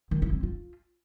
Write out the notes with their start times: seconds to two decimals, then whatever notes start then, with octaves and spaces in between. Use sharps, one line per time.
0.11 D#3
0.22 E4
0.32 C4
0.43 F4